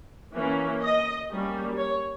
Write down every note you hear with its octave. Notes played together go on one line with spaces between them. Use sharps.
E3 A#3 C#4
D#5
G3 A#3 C#4
C#5